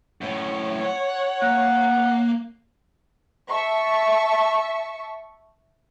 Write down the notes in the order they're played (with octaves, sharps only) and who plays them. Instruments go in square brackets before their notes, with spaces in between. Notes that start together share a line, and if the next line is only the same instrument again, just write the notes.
[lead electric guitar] F#2 A2 [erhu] C#5
[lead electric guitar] F#5
[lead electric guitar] A#3 [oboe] F#5
[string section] E5 A5 C#6